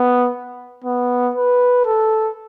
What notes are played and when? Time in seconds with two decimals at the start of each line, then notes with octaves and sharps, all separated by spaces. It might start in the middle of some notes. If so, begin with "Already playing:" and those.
Already playing: B3
0.84 B3
1.35 B4
1.86 A4